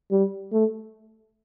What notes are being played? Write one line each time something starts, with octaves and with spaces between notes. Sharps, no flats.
G3
A3